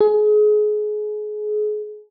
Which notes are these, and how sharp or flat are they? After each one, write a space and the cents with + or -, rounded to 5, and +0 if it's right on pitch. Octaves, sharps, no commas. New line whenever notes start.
G#4 +30